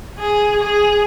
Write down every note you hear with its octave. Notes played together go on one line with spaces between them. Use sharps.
G#4
G#4